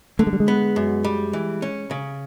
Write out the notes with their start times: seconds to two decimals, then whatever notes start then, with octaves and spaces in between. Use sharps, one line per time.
0.19 D3 A3
0.27 G#3
0.33 G3
0.40 G#3
0.48 B3
0.76 F#2
1.04 G3
1.33 E3
1.62 C#4
1.91 C#3